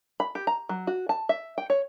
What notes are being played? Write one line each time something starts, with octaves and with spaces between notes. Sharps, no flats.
B5
G4
A#5
F#3
F#4
A5
E5
G5
C#5